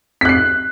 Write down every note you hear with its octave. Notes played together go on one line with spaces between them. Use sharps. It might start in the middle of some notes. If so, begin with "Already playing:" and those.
F#6 B6 C7